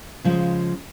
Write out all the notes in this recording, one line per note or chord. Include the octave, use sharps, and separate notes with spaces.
C#3 F3 G#3